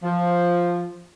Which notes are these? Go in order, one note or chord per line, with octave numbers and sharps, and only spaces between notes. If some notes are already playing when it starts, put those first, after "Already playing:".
F3